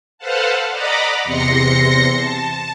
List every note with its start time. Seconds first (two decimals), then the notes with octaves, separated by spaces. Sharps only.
0.18 A4 B4 C5 F5 F#5 A5
0.70 D5 D#5 F#5 A#5 B5 D6
1.23 E2 C3 C6 A#6 C#7
2.16 A5